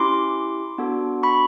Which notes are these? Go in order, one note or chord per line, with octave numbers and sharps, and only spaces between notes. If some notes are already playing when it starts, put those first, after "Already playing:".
Already playing: C#4 E4 G4 C6 D6
B3 D4 F#4 A4
B5 C#6